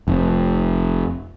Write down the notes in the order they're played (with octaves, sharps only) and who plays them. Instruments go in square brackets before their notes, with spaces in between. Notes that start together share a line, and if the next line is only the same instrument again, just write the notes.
[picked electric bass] F1